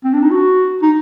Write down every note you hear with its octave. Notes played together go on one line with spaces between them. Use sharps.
C4
D4
D#4
F#4
D#4